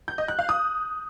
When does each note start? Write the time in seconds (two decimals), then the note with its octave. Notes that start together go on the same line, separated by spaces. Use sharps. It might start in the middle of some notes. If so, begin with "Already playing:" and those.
0.08 G6
0.18 D#5
0.28 F#6
0.39 F5
0.49 D#6